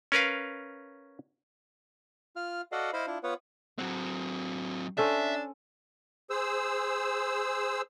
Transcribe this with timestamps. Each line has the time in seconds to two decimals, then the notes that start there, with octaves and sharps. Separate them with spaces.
0.12 C#4 A#4 B4 F5
2.36 F4 F6
2.72 F#4 A4 D5 D#5 F5 F#5
2.93 E4 C5 D#5 F5 B5
3.07 D4 E4 F4
3.23 B3 F4 B4 C#5 F#5
3.78 F#3 C4 F#5
4.98 C#4 D4 A4 C5 E5
6.30 G#4 C5 E6